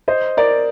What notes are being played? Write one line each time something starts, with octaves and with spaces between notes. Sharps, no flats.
C5 D#5
A#4 D5